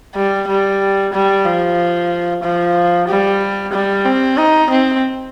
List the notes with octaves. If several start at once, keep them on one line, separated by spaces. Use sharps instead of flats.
G3
G3
G3
F3
F3
G3
G3
C4
D#4
C4